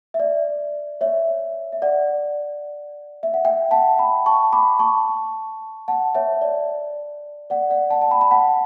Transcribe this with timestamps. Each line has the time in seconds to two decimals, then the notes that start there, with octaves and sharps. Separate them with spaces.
0.14 E5
0.20 D5
1.01 C#5 E5
1.72 E5
1.82 D5 F#5
3.23 E5
3.34 F#5
3.45 E5 G5
3.71 F#5 A5
3.98 G5 B5
4.26 A5 C#6
4.53 B5 D6
4.79 A5 C#6
5.88 F#5 A5
6.15 C#5 E5
6.33 C#5
6.42 D5
7.50 D5 F#5
7.70 D5 F#5
7.90 F#5 A5
8.02 A5
8.11 G5 B5
8.21 B5
8.31 F#5 A5